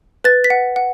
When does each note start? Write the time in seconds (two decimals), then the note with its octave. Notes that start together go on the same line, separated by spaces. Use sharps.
0.24 B4 A6
0.44 B6
0.50 F#5
0.76 F#5